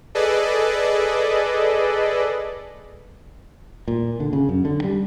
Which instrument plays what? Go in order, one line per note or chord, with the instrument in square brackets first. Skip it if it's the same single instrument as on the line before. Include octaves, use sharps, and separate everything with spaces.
[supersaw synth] G#4 A4 B4 D5 D#5
[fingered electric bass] A#2
D3
C#3
F#2
D3
G3